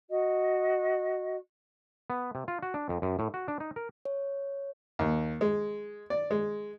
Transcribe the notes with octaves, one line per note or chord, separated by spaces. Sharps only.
F#4 D#5
B3
C3
F4
F#4
D4
F2
F#2
A2
F#4
D4
D#4
A#4
C#5
D#2
G#3
D5
G#3